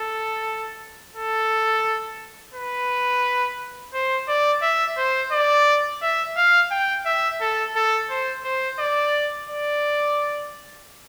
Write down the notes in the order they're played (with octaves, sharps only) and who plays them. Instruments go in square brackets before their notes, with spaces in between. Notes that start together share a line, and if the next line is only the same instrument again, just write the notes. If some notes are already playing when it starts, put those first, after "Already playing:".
Already playing: [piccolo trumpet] A4
A4
B4
C5
D5
E5
C5
D5
E5
F5
G5
E5
A4
A4
C5
C5
D5
D5